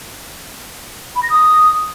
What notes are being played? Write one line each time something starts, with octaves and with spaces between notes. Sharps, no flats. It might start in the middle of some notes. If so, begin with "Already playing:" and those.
B5
A#6
D#6